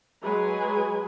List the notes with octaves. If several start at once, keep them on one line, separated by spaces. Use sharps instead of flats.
F#3 G#3 G#4 B4 G#5